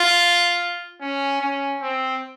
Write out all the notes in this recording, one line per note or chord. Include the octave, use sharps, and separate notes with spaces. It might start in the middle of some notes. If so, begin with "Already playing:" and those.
Already playing: F4
C#4
C#4
C4